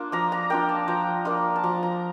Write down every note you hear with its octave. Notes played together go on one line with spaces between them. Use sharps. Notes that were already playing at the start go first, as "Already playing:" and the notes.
Already playing: A#3 D4 F4
F3 A#5
A#5
A#3 D4 F4 G5
A5
F3 A#5
A#3 D4 F4
A5
F3 A#5
A#5